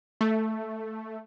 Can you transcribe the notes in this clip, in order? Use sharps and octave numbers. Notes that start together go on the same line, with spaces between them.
A3